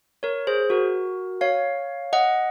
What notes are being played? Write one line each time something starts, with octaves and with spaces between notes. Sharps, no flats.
A#4 C#5
G#4 C5
F#4 A#4
C#5 F5
D#5 F#5